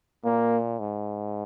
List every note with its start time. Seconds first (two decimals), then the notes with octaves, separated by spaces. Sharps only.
0.25 A#2 A#3
0.79 G#2